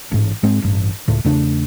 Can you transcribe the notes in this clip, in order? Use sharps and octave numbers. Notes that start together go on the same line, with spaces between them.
A1 G#2
G#2 G#3 C4
A1 G2
C#2 A2
E2 C#3 A3 D4